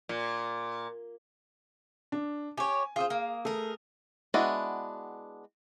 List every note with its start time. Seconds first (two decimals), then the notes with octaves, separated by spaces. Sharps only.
0.09 A#2
2.12 D4
2.57 G4 C#5 G#5
2.96 F4 G#4 C5 D#6
3.10 A#3
3.45 A3 G#4 A#4
4.34 G#3 B3 D4 E4 F#4